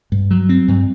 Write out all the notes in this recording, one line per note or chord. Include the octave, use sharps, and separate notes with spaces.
G2
F#3
C4
G2